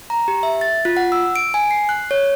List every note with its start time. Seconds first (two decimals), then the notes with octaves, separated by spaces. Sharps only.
0.10 A#5
0.28 G4
0.43 E5
0.61 A6
0.85 F4
0.97 F#5
1.12 E6
1.36 D7
1.54 G#5
1.71 C7
1.89 F#6
2.11 C#5